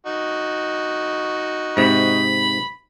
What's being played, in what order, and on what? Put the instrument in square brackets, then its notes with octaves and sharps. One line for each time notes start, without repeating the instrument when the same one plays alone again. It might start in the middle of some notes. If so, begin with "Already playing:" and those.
[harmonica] D#4 F#4
[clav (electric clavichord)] G#2 C3 [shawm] B5